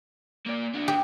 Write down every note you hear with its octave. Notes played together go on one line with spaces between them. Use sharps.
A#3 D5
D4 F#4
G4